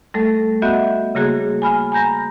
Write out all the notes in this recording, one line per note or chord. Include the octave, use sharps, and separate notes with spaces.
G3 A3 A4
B3 F#4 D#5 E5 F#5 G6
C#3 G3 A#3 F#4 G#4
G#5 B5 F6
G#5 A#5 B5 G6 A#6